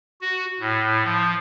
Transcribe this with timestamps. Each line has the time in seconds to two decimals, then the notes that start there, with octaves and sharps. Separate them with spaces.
0.21 F#4
0.60 A2
1.04 F3